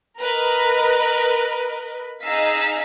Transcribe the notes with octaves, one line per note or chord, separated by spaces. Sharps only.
A#4 B4 D#5 B5
D#4 G#4 D#5 F5 E6 B6